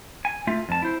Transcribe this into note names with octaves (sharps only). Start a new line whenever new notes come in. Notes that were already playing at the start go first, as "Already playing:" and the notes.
G#5
A3 F4 E5
F2 A5
E4 C5